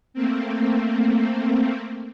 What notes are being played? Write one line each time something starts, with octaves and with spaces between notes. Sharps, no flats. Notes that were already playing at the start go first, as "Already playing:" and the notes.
A3 A#3 C4